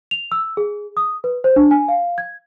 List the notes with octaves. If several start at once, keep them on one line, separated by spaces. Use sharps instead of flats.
F7
E6
G#4
D#6
B4
C5
D4
G#5
F5
G#6